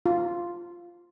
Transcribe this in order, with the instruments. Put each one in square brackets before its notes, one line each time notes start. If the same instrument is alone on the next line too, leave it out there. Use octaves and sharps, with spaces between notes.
[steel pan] F4